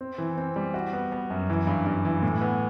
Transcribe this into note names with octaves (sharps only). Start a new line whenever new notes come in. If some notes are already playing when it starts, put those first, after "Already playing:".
C4
E3
C4
G3
F#4
B3
B3
F#2
E3
G2
G2
E3
A2
B3